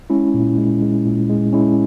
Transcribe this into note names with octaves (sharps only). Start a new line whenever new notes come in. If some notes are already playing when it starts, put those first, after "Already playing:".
G#3 C#4 E4
A#2
G#3
G#3
A#2
G#3
G#3 C#4 E4